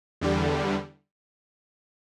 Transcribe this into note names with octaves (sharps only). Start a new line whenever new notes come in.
E2 D3 G3